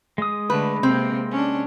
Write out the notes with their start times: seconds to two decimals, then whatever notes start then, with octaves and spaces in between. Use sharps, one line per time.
0.18 G#3 D#6
0.50 D3 A3 B4
0.83 C3 A#3 C4
1.32 C#4 D4